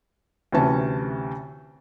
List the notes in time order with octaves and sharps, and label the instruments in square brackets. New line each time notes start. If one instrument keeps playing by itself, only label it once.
[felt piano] D2 C3 E3 C#4 B4 A5